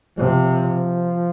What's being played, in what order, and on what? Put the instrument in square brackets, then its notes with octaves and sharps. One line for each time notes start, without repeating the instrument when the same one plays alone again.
[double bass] C3 [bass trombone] F3